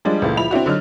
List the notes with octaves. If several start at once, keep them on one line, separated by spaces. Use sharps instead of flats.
F3 G3 G#3 D4
C#2 A#2 E3 A3
F3 E4 B5 F7
C4 D4 E4 F#4
D3 F#3 D#4 F6